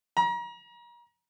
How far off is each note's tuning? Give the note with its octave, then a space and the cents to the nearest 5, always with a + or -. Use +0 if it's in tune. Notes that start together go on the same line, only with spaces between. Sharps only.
A#5 +35